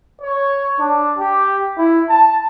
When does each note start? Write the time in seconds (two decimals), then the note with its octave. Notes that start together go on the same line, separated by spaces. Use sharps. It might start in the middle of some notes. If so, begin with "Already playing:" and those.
0.22 C#5
0.80 D4
1.19 G4
1.77 E4
2.09 A5